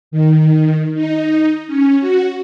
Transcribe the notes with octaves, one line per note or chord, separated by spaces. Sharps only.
D#3
D#4
C#4
F#4